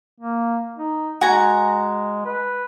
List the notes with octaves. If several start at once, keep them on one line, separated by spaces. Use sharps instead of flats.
A#3
D#4
G#3 F#4 G#5 A#5
B4